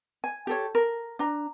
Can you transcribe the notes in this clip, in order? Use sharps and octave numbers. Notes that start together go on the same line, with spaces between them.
G#5
G4 A4 C#5
A#4
D4 A#5